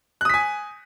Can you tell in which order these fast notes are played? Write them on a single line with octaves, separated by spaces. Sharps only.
F#6 D#6 B6 G#5